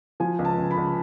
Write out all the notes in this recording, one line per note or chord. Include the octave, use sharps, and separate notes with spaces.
F3 G#5
C#2
A5
C#2
B5
C#2